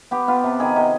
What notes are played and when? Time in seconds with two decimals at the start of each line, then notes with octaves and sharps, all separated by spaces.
0.11 B3 G4
0.28 B3 F4
0.44 C3
0.60 D#3 G#4
0.76 C3 D#5